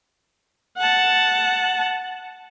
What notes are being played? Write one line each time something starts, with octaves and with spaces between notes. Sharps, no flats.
F#5 A5